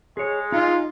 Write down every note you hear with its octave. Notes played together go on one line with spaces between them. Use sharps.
G#3 G#4 C#5
D#4 F4 D#5